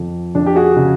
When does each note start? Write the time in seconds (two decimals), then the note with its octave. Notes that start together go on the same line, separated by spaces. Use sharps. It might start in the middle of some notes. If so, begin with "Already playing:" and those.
Already playing: F2
0.35 F2 D4
0.46 G4
0.56 F#4 G#4
0.77 C#3